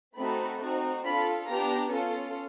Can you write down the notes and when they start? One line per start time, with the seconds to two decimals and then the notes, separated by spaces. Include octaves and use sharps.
0.16 A3 C4 D#4 F#4 A4 B5
0.60 C4 D#4 F#4
1.03 D4 F4 A4 B5
1.47 B3 D4 G4 A#5
1.91 C#4 F4 A4